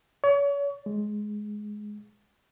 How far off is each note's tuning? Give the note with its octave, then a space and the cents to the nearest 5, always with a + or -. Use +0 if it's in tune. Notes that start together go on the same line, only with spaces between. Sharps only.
C#5 +35
G#3 +15